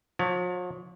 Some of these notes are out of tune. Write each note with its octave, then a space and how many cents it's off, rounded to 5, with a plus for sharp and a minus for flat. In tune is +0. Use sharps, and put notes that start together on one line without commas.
F3 +45 C#5 +35